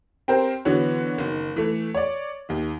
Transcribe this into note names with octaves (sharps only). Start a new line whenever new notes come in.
C4 G4 A#4 C5
D3 E3 B3 F#4 C#5
F#1 D#3
E3 A3
C#5 D5
D#2 D#3